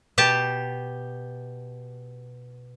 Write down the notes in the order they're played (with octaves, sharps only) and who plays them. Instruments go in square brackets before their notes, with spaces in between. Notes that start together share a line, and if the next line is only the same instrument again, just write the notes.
[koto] B2 G4 A5